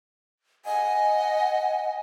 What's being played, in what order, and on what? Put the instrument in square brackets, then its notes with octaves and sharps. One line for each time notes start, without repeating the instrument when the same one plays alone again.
[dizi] D#5 [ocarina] F#5 [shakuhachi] G#5